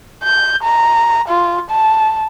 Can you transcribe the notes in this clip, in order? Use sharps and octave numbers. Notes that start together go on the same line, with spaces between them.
G6
A#5
F4
A5